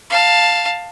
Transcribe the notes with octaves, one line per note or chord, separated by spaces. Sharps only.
F5 A5